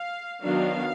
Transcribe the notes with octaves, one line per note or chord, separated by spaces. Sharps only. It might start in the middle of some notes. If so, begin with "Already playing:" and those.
Already playing: F5
D#3 F#3 B3 D4 F5